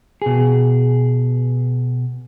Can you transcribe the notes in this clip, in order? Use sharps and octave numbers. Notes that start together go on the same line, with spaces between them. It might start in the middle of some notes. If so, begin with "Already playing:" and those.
B2 G#4